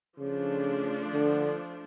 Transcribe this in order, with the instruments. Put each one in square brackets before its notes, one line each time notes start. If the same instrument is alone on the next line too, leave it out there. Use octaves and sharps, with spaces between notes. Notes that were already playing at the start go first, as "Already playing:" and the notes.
[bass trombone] C#3 [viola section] F3 A3 D4
[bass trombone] D3